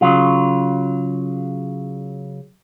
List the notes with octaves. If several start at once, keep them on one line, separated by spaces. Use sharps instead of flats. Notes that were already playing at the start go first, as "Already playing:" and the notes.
C#3 F#3 F4